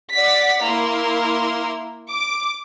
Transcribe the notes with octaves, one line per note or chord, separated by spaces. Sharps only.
D5 F#5 A6 B6
A#3 E4 A#4 C6
D6